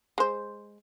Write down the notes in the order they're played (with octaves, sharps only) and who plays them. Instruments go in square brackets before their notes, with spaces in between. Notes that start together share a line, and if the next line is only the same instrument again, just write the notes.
[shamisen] G#3 C5